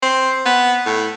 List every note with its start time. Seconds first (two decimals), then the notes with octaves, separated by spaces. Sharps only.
0.02 C4
0.45 B3
0.86 A2